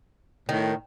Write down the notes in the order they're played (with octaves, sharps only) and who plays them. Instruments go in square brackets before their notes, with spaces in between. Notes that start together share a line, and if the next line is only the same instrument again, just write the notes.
[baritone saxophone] A2 [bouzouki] D#3